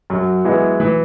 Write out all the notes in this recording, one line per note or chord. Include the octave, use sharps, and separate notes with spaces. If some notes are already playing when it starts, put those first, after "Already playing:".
F#2 F#3
E3 G#3 B3 E4
E3